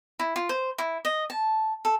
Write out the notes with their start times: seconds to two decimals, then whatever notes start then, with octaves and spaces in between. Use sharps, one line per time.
0.19 E4
0.36 F4
0.49 C5
0.78 E4
1.05 D#5
1.30 A5
1.85 A4